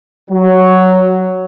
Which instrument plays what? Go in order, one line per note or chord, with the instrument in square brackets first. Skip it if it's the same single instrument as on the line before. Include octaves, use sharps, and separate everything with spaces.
[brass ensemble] F#3